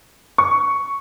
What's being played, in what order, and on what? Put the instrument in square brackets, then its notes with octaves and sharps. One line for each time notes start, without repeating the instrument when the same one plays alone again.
[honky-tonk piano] C#6